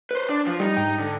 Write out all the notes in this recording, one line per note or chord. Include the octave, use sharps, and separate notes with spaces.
B4 C5
D4
F3
G3 D#4
G#2 G5
D3